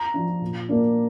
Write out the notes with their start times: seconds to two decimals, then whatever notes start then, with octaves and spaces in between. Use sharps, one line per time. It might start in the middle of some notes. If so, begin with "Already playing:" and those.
Already playing: A#5
0.14 F3 D4 F4
0.42 A#2
0.69 A#3 D4